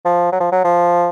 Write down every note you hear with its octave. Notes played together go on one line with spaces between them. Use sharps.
F3
F#3
F3
F#3
F3